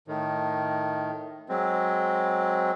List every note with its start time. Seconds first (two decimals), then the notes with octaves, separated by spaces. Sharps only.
0.08 A2 D#3
1.49 F#3 G#3 C4